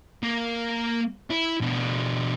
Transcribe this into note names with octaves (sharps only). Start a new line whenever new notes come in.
A#3
E4
B2 D4